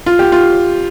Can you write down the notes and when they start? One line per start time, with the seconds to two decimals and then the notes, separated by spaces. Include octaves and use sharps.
0.06 F4
0.19 G4
0.32 F4